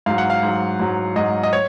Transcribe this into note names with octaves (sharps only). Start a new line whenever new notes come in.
G#2 F#3 F5
F#5
F5
G#2 F#3
G#2 F#3
G#2 F#3 D#5
D#5
C#5